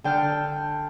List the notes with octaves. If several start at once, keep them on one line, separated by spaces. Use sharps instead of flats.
D3 G5 A5 F6